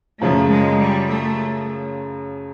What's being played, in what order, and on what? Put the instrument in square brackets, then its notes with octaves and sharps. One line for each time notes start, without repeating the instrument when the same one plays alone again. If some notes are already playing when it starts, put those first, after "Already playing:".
[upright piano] F#2 C#3 F3 [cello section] A3
[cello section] G#3
G3
A3